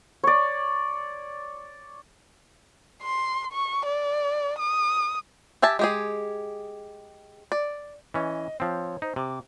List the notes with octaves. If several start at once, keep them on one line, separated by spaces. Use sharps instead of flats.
C#5 D5
C6
C#6
D5
D#6
G4 E5 G#5 A5
G#3 G4 G#4
D5
E3 C#4 D#5
F3 C4 C#5
D#4 C5
C3 D6